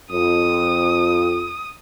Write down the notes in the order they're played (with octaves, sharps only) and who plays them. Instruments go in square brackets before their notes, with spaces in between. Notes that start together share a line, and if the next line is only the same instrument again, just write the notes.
[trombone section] F2 [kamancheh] D#6